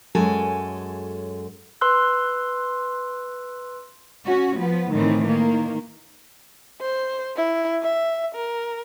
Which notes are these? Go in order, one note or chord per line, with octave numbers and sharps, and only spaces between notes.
F#2 G#3 A4 C#5 G#5
B4 C6 E6 F#6
C#4 F#4
F3 B3
A2 D#3 E3 C4
D#3 A#3
C5
E4
E5
A#4